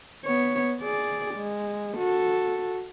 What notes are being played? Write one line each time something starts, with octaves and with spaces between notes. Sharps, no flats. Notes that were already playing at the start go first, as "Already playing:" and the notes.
B3 C#5
G#4 D5
G#3
F#4 A4